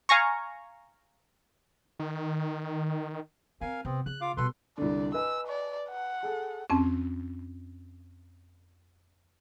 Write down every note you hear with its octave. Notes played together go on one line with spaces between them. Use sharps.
F5 G#5 A#5 C#6
D#3
C4 A#4 F5 G#5
C3 B3 C4
C#3 F#6
F4 F5 D6
B2 G3 A4 B4 C6
C2 D3 D5
B4 D#5 G#5 E6
D5
F#5
G#4 A4
F2 C4 C#4